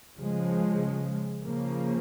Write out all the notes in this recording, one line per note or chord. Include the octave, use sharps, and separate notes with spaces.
C#3 F3 G#3
C#3 F3 A#3